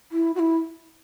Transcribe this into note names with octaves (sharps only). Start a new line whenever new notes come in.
E4
F#4
E4